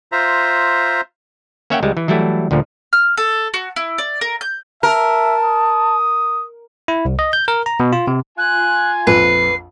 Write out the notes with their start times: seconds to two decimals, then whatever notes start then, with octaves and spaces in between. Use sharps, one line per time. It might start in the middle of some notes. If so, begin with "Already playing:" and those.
0.12 F4 C5 E5 A#5
1.70 A#3 C#4 C#5 E5 F#5 G5
1.83 C#2 G3 G#3
1.97 E3
2.08 E3 F#3 G3 A3 E4
2.51 D2 A#2 D3 F3
2.93 F6
3.17 A4
3.54 F#4
3.76 E4
3.98 D5
4.21 A#4
4.41 G6
4.83 A#4 E5 A5
5.45 D#6
6.88 E4
7.05 C2
7.19 D#5
7.33 G6
7.48 A#4
7.66 A#5
7.80 B2
7.93 F4
8.07 C3
8.38 F4 G#5 F#6
9.07 A#1 F2 B4 C7